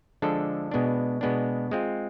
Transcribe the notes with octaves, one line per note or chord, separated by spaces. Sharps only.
D3 F3 G#3 D4 A4
B2 G#3 B3 D4
B2 G#3 B3 D4
G#3 C4 F4